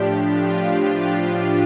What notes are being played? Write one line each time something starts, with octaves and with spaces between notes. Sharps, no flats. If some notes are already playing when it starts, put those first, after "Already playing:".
Already playing: A2 F3 D4 G4
F4
F4